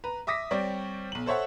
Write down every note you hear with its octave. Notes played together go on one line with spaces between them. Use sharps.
B4 A#5
E5 D6 D#6 A#6 B6
G3 C4 G4 C#5 D5
B1 F#7
A4 C5 C#5 E5 F#5